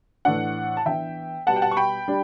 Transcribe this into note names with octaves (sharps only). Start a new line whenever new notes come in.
A2 E3 A3 D4 F#5
A5
E3 B3 D4 E5 G5
B2 G3 B3 F#5 A5
G5
F#5 A5
C#6
G5 B5
G3 D4